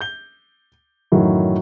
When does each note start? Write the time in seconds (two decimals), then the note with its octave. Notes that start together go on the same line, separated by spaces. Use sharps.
0.01 G6 G7
1.12 F#2 A2 D#3 E3 F#3 E4